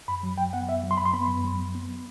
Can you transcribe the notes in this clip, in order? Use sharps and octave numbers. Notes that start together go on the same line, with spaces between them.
F#2 B5
F#3
F#2 G5
B3 F#5
F#2 E5
F#3
C6
F#2 B5
C6
B3 B5
F#2
F#3
F#2
B3